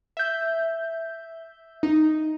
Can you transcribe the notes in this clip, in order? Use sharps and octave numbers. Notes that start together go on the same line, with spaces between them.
E5 G6
D#4